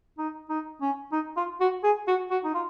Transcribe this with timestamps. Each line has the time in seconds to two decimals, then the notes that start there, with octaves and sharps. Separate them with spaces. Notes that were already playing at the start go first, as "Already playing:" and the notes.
0.18 D#4
0.49 D#4
0.82 C#4
1.13 D#4
1.37 F4
1.61 F#4
1.84 G#4
2.08 F#4
2.31 F#4
2.45 D#4
2.55 F4